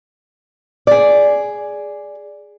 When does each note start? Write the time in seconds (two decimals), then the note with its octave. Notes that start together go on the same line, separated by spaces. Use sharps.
0.87 G#4 D5